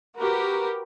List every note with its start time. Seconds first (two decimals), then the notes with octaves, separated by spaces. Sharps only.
0.18 F#4 G4 A#4 B4